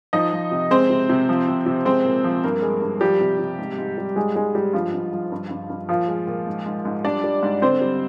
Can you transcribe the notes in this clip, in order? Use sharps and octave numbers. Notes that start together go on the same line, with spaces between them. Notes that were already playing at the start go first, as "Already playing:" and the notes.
F3 D#4 D#5
F3
C3
G#3 C4 C5
C3
C3
F3
C3
C3
G#3 C4 C5
A#2
F3
G2 A#3 A#4
G#3
G2
F3 G3 G4
C3
C3
G#2
G#2
G3
G#2 G#3 G#4
G#2 G#3 G#4
G#2 G3 G4
G2 F3 F4
G2
F3
G2
G2
G2
A#2 F3 F4
G#3
A#2
G#2
G#2
G#2
G3 D4 D5
G3
G#2
D3 C4 C5
G3